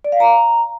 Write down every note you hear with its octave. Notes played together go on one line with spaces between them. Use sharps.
D5
F5
A#5